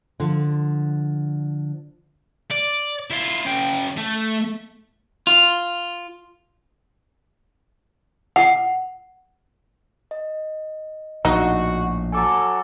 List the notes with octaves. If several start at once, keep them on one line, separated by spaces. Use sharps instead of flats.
D3 F3
D5
E4 F4
C#3 G5
A3
F4
F#5
D#5
A#1 A2 D#4 F#4
F#3 A4 G#5 D6